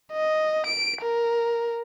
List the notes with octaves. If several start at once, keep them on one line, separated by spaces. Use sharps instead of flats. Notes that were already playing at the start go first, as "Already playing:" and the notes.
D#5
D7
A#4